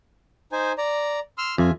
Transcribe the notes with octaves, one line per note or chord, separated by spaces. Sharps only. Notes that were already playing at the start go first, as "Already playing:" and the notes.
D#4 C5 G#5
D5 A#5
C6 E6 F6
F2 F4 E5 G#5